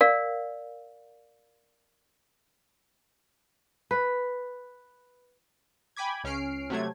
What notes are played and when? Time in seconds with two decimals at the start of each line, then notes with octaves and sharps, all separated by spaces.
0.01 A#4 D5 F5
3.91 B4
5.97 G5 G#5 B5 D6 G#6
6.24 C#2 C#4 F6 C7 D7
6.70 C3 F#3 A3 G#6